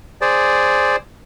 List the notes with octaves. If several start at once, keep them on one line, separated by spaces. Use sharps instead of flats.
G#4 C5 D5